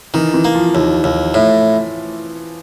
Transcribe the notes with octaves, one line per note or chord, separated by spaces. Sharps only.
D#3 E3
E3
A#3
F3
D#2
D#2
A2